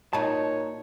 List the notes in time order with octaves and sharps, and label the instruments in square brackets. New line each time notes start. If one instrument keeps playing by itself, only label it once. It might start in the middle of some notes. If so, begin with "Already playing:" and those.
[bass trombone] A#2 [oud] D#4 F#4 [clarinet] C#5 [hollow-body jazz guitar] A5